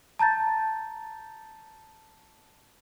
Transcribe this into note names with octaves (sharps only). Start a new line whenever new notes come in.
A5 A#5 G6 A6